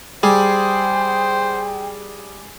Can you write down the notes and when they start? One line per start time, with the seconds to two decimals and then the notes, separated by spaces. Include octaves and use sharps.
0.23 G3 G#4 C5 G5